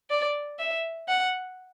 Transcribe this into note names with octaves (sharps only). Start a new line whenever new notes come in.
D5
E5
F#5